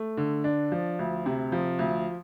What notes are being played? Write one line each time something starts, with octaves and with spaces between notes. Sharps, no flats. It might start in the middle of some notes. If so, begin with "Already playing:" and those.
Already playing: A3
D3
D4
F3
D2
C3
F3
D2